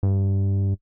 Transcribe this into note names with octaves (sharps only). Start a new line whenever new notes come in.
G2